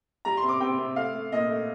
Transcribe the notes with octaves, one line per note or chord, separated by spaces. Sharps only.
G3 A#5
C6
C3
D6
C3 G5
C3
A3 F5
A3
A#2 D#5
A3